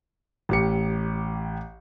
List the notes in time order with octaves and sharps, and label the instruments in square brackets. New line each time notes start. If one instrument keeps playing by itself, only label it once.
[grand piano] A1 G4 C#7